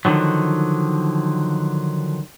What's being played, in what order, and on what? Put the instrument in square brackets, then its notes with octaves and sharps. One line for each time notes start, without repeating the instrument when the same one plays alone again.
[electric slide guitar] D3 D#3 F3 F#3